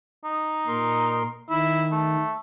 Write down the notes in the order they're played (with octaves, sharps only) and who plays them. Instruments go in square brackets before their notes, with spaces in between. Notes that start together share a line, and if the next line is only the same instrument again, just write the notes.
[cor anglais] D#4
[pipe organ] A#2 A#4 C6
[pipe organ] D#3 [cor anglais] E4
[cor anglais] A3